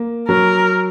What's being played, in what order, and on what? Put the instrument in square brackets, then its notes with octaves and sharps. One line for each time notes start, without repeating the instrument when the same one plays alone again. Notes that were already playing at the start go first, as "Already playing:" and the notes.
Already playing: [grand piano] A#3
[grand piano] F#3 [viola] A#4